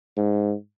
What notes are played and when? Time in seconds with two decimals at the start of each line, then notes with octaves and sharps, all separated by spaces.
0.17 G#2